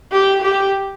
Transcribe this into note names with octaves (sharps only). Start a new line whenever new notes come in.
G4
G4